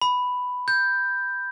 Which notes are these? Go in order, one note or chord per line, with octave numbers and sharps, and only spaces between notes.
B5
G6